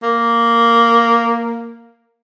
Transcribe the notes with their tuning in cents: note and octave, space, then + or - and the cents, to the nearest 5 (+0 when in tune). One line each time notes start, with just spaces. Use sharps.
A#3 -5